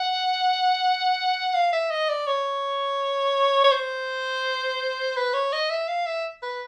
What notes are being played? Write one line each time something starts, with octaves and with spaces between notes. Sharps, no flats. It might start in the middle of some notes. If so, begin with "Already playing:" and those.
Already playing: F#5
F5
E5
D#5
D5
C#5
C#5
C5
B4
C#5
D#5
E5
F5
E5
B4